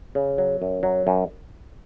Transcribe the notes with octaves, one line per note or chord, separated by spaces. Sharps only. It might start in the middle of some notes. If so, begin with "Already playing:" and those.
C#3
F#3
F#2
F#3
F#2